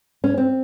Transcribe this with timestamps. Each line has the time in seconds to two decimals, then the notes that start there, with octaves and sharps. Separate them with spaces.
0.24 C#4
0.38 C4